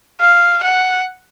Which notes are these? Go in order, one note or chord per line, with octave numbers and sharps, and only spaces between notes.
F5
F#5